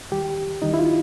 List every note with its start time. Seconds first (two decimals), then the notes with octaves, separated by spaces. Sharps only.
0.11 D#2 D#3 G3 G4
0.62 D#2 D#3 G3 D#4
0.74 E4
0.79 F4